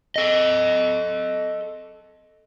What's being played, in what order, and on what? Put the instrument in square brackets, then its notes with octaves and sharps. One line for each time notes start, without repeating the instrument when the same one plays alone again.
[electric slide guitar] A4 D#5